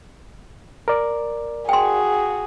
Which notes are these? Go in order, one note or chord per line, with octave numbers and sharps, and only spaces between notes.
A#4 D5
F#4 G#4 G5 C6